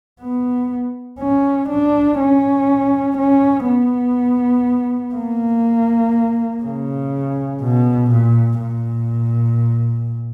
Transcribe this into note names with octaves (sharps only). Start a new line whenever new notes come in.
B3
C#4
D4
C#4
C#4
B3
A#3
C#3
B2
A#2
A#2